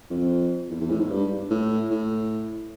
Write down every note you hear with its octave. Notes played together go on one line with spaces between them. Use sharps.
F2
E2
E2
A2
G#2
G2
A2
A2